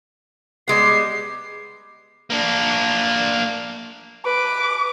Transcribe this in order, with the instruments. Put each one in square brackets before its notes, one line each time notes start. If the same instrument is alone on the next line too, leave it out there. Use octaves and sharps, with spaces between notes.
[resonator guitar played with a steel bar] G3 G#3 B3 [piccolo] C7
[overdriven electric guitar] A#3 D4
[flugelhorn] B4 [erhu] D6